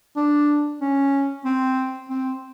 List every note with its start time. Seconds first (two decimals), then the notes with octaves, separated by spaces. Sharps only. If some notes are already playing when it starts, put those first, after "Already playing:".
0.16 D4
0.81 C#4
1.45 C4
2.09 C4